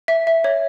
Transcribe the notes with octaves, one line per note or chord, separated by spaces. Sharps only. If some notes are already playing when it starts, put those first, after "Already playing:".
E5
E5
C#5